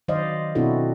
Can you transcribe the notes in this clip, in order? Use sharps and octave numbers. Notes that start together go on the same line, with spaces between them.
D#3 F#3 C5 D5 D#5 F5
B2 C4 D4 E4 F#4 A4